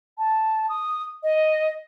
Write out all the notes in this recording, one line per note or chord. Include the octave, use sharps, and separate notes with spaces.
A5
D#6
D#5